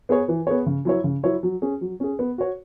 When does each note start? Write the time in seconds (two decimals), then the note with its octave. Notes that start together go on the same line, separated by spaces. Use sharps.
0.09 B3 G#4 C#5
0.28 E3
0.47 B3 G#4 C#5
0.66 C#3
0.85 F#3 E4 C#5
1.04 C#3
1.23 F#3 E4 C#5
1.43 F#3
1.62 C#4 G#4
1.81 F#3
2.00 C#4 G#4
2.19 B3
2.38 F#4 C#5